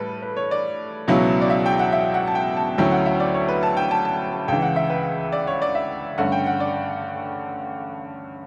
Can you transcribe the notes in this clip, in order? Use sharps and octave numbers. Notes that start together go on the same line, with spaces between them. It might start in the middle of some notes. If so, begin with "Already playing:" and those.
Already playing: A2 G3 A4 B4
B4
C#5
D5
C#2 B2 F#3 C#4 E4
D5
E5
G5
F#5
E5
F#5
A5
G5
A5
D2 D3 F#3 C#4 E4 G5
F#5
E5
D5
C#5
B4
A5
G5
A5
A5
C#2 C#3 E3 G5
F#5
E5
B4
D5
C#5
D5
E5
G2 D3 A3 C#4 F#5
G5
F#5
D5